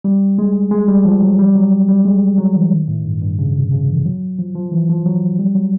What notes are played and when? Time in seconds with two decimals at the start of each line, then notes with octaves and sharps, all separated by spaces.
0.04 G3
0.38 G#3
0.71 G#3
0.88 G3
1.05 F3
1.22 F#3
1.39 G3
1.55 F#3
1.88 G3
2.05 G#3
2.38 F#3
2.56 E3
2.72 D#3
2.88 A2
3.05 G2
3.22 G2
3.39 C#3
3.56 C3
3.72 C#3
3.89 E3
4.06 F#3
4.39 F3
4.55 F3
4.72 E3
4.89 F3
5.06 F#3
5.39 G3
5.55 F#3